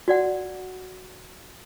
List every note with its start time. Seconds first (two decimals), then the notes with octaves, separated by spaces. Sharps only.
0.08 F#4 D5 F#5